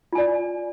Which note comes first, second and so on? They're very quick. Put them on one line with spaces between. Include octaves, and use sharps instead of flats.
F4 G#5 D5